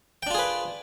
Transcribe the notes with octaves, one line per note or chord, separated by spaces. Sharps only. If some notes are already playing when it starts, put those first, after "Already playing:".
D4 F4 G#4 B4 G5